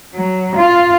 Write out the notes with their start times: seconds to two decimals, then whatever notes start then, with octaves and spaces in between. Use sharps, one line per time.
0.14 F#3
0.56 F4